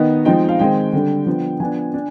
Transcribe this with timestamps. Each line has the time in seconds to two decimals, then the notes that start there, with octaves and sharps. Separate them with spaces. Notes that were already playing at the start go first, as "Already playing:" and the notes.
Already playing: D#3 B3 D#4 D#5
0.25 F3 G#3 C4 D#4 G5
0.49 F5
0.59 D#3 G#3 C4 G5
0.93 D3 G3 D4
1.26 F3 B3 D4
1.60 F3 B3 D4 G#5
1.94 D4